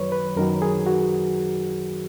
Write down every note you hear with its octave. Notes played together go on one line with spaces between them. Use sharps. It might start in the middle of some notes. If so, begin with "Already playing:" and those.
Already playing: F#2 D#3 F#3 B4 C#5
B4
F#2 D#3 F#3 A#4
G#4
F#4